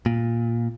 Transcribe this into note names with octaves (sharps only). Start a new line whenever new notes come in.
A#2